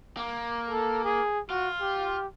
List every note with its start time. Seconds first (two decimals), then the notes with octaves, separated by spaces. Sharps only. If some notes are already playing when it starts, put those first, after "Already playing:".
0.17 A#3
0.69 A4
1.04 G#4
1.50 F4 F#4
1.81 G4